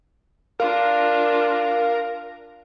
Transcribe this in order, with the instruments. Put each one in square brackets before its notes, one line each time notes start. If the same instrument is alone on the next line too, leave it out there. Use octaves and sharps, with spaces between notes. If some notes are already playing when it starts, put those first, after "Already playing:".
[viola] D4 F4 [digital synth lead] A#4 [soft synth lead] F5